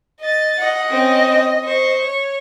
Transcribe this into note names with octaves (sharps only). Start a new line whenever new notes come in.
D#5 A6
D#5 F#5
C4 C#4
C5 C#6
C#5